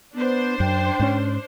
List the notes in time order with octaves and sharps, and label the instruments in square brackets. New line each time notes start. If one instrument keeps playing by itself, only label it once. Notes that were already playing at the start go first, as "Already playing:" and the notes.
[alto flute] B3 [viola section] D4 C5
[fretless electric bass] F#2 [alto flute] G5
[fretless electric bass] G#2 C4 C#4